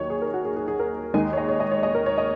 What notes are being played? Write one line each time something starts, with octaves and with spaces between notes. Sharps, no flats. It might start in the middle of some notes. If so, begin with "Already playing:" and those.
Already playing: D#2 D#3 F#3 D#4 C#5
G#4
A#4
F#4
G#4
G#4
G#4
A#4
D#2 D#3 G#3 D#4 G#5
C#5
D#5
C#5
D#5
C#5
D#5
A#4
C#5
D#5